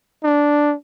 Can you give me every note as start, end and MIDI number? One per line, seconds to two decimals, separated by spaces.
0.24 0.75 62